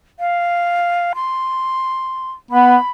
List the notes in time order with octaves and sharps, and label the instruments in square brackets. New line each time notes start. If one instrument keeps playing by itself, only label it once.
[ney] F5
C6
[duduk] B3 [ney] B5